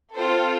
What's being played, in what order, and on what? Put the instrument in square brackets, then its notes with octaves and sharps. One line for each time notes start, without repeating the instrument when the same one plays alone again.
[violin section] C4 F4 A4 C5